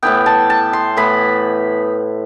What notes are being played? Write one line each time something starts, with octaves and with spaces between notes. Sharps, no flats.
A2 E3 B3 G5
A5
A5
C6
A2 E3 B3 B5